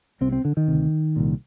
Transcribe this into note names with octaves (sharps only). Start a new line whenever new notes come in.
C2 C3 C4
C4
D3
D#3
D2 C3
C2 A#2